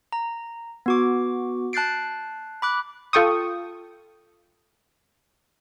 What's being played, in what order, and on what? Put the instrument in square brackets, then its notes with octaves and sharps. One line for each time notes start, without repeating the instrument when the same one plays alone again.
[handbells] A#5
B3 F#4 D6
A5 F#6 G6 A6 C7 D7
B5 D6 F#6
[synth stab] F4 A4 G5 C#6 D#6